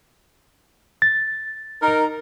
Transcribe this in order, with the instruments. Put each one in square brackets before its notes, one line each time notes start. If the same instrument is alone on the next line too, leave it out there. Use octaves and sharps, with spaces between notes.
[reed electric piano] A6
[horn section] D#4 A#4